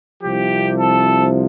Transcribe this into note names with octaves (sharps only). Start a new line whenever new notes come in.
C2 C3 F3 G4
A4